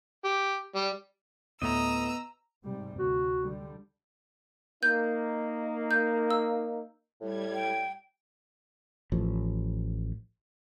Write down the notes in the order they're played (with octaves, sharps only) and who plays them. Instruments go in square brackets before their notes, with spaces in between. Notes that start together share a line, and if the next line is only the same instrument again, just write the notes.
[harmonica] G4
G3
[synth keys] D2 A2 A3 [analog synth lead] B3 [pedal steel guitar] D#5 [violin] A#5 E6
[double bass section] G#2 C3 G3
[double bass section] D2 [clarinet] F#4
[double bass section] D3 G3
[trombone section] A#3 D#4 [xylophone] G6
[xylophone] G6
E6
[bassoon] A2 [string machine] G3 G#6
[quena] G5
[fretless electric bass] A1 F3